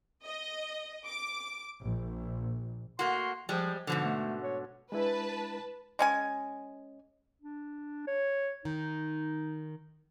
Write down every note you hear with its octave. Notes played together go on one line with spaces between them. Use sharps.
D#5
D6
A#1
A3 A#3 F#4 C6
F3 G3 G#3
G#2 B2 D3 F3
A3
C#5
G#3 D4 E4 B4 A5
G#3 C#4 G#5
D4
C#5
D#3 D#4